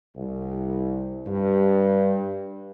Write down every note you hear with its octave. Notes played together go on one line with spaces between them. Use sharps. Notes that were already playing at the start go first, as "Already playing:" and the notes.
C2
G2